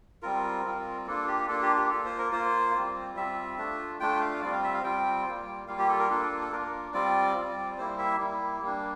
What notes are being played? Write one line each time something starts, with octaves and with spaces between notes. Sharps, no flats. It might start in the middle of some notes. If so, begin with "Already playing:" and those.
G3 C4 F4 A#4
G3 C4 F4
A#3 D4 F4 A4
G4
A#3 D4 F4 A4
G4
G4
A#3 F4 A4
C5
A#4
A#3 F4 C5
G3 C4 F4
G3 C4 F4 E5
A3 D4 F4
A3 D4 F4 G5
F5
G3 C4 F4 D5
F5
E5
F5
G3 C4 F4 G5
G3 A#3 F4
G3 A#3 F4 F5
G4
A4
A#4
A#3 D4 F4 A4
A4
A#3 D4 F4 A#4
G3 C4 F4 D5
G3 C4 F4
G3 A#3 E4 C5
E5
G3 A#3 E4
G3 A#3 D4